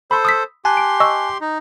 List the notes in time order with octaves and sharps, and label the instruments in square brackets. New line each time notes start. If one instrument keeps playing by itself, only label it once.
[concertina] A4 C5 [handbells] B5 C6
[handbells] D#6 E6 B6
[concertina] G4 C6 [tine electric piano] G#5 A5 F#6
[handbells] D7
D#5 C#6 E6
[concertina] D#4